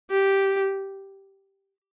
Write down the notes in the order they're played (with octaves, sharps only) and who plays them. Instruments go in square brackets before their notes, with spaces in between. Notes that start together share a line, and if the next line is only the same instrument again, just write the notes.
[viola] G4